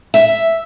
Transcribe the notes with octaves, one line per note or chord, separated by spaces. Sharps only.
E5